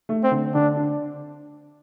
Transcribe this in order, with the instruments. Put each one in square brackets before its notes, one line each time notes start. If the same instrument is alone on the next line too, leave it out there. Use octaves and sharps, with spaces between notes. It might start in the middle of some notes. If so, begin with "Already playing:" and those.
[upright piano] A3
[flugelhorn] C4
[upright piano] D3
[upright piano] D3 [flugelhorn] D4
[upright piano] D4